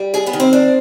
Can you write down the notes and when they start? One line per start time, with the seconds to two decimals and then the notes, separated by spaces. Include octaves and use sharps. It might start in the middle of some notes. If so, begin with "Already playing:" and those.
Already playing: G3
0.14 D#2 G#4 G#5
0.26 B3 B4
0.33 D#3
0.40 C4 C5
0.53 D4